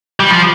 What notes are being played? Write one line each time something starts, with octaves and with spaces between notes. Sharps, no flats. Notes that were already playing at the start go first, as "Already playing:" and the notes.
G3
F3